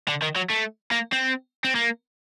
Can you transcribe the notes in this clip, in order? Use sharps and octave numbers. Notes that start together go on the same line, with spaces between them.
D3
D#3
F#3
A3
A#3
C4
C4
A#3